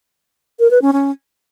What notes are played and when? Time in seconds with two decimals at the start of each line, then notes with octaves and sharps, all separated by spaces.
0.59 A#4
0.71 B4
0.82 C#4
0.93 C#4